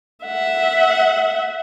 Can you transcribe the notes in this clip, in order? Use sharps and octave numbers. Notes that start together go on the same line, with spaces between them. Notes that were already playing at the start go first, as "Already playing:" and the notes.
E5 F#5